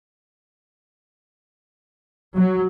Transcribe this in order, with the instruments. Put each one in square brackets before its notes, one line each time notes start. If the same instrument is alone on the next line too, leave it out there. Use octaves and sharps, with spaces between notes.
[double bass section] F#3